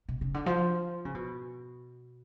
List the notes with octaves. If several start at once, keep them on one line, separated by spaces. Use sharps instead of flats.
B2
C#3
D3
F3
C#3
B2